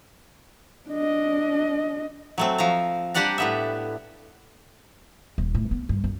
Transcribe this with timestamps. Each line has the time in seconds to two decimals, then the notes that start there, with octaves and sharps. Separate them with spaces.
0.90 D4 D#5
2.38 F#3 A3 C4
2.58 F3 A#5
3.14 G3 D4 G4 D5 F#5 A#5
3.38 A2 B3 E5
5.38 D#1
5.55 A2
5.71 B3
5.89 G2
6.04 F#2